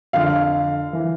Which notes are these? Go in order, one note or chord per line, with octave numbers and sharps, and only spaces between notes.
F2 D3 F5
E3